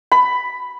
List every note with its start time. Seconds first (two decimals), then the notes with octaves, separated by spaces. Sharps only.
0.12 B5